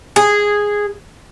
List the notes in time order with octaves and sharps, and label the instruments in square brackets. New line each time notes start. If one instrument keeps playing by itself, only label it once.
[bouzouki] G#4